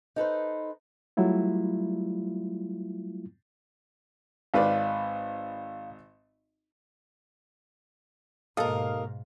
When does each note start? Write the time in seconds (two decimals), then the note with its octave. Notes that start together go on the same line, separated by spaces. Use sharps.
0.16 D#4 A4 B4 C5
1.17 F#3 G3 A3 E4 F4
4.54 G#1 B4 D5 F5
8.57 D#2 G#2 B2 A4 A#4 D#5 F5 D#6